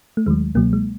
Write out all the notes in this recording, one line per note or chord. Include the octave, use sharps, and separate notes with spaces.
A3
D#2 D#3 F#3 G#3
C#2 B2 F#3 A#3
G#3